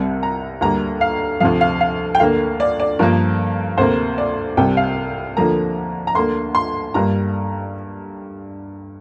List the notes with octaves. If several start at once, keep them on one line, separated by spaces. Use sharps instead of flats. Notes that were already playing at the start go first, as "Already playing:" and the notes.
Already playing: C2 C3 G3
A#5
D2 D3 G3 A#3 A#5
F5
D2 C3 F3 F5
F5
F5
G5
D2 D3 A#3 F5
D5
D5
G2 F3 A#3 A#4
D2 C3 A#3 C5
D5
C2 C3 G3 G5
F5
D2 D3 F3 A#3 A#5
A#5
D2 D3 A#3 C6
C6
G2 G3 A#3 A#5